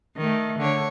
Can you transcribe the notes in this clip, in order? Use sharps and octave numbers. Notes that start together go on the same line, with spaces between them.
D#3 A3
D3 C#5